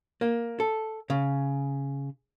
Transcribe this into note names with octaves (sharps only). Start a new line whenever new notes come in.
A#3
A4
C#3